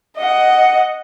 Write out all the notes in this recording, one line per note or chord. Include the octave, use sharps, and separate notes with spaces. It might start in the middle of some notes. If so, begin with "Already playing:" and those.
D#5 F#5